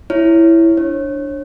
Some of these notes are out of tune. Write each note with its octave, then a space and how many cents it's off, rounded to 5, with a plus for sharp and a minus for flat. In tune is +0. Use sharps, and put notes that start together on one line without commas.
E4 +5 C#5 +0
D4 +0 C#5 -30